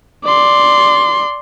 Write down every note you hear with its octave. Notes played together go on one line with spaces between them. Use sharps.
D5 C6